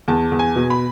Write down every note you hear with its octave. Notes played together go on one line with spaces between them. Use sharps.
E2 A5
E2
G#5
B2
B5